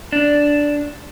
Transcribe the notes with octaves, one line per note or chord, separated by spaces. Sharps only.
D4